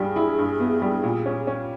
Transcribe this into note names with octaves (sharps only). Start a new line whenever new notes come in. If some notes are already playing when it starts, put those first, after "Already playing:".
Already playing: G2 G3 G#4
E4
G2
B3
G3
A#2
C#4
C#4